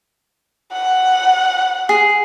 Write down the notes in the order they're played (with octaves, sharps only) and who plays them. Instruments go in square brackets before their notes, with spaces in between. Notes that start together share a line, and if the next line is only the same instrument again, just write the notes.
[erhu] F#5
[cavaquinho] G#4